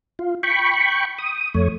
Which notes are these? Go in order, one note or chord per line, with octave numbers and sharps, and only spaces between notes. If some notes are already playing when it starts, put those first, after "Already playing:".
F4
G5 B5 C#6
D#6
F2 A3 C#5